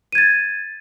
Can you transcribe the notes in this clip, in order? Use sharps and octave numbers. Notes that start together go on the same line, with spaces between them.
G#6 A6 D#7